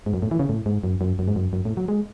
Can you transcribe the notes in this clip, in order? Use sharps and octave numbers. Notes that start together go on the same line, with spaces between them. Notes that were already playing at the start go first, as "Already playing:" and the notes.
G#2
F#2
A2
E3
C#3
A2
G#2
F#2
F#2
F#2
G#2
F#2
F#2
A2
F#3
G#3